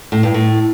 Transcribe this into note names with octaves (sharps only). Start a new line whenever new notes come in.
A2
G2
A2